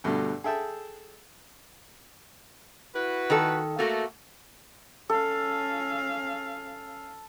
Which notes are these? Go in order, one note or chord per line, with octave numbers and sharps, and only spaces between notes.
D2 G2 B2 A3
G#4 A4 E5 G5 A5
E4 F#4 B4
D#3 A4
A3 A#3 F#4 A4
C#4 A4 F5